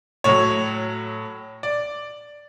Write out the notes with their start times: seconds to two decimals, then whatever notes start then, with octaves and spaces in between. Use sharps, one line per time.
0.24 A2 F#3 C#5
1.63 D5